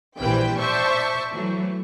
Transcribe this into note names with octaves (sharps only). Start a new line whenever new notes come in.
A#1 E3 G3 C5 G5
C5 D5 E5 A5 C#6
E3 F#3 A3